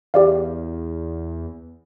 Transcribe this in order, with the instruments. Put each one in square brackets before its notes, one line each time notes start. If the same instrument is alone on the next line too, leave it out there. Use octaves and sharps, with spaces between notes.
[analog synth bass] E2 [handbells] G4 D5 F5